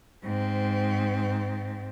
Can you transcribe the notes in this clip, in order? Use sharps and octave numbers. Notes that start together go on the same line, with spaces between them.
G#2 C4